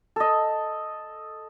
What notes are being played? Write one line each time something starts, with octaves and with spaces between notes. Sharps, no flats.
A4 D#5